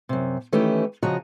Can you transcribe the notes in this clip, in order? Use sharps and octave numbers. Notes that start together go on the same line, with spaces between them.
F#2 C3
D#3 E3 A3 C#4 G4
C#3 F3 F#4 D#5 A#5